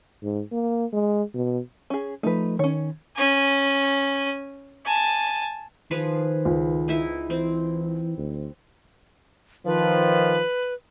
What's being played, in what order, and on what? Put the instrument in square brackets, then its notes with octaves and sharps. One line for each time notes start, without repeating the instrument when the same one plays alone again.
[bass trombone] G#2
A#3
G#3
B2
[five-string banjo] C#4 G#4
[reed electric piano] F3 A3 [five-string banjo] D#4 B4
[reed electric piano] D#3 [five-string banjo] C#4 C#5
[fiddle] C#4 G#5
G#5 A5
[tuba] D#3 [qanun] F3 G#4 B4
[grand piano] C#2
[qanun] D#4 E4 E5
[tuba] E3 [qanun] C4
[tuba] D2
[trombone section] D#3 F3 [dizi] B4